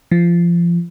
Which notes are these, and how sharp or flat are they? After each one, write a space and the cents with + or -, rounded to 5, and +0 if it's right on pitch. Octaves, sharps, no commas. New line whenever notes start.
F3 -25